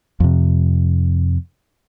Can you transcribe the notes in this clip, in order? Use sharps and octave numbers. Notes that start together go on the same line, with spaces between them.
F2 C3